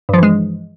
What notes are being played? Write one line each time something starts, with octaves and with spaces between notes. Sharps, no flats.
G2 E3 F3 G#3